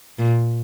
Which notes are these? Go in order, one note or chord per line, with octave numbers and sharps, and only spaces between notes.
A#2